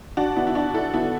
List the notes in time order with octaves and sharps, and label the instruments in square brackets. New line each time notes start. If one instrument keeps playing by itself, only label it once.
[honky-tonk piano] D4 F#4
B3 E4
E4
D4 F#4
E4 A4
B3 E4